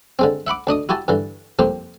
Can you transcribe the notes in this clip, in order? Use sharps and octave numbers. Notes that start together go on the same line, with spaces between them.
D3 G#3 C4
E5 F#5 B5 D6
D2 D4 D#5 D#6
E4 F#4 G4 G#5 A5
G2 D3 E3
C2 F2 A#3 C4 G4